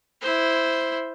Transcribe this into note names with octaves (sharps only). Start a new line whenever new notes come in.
E4 C5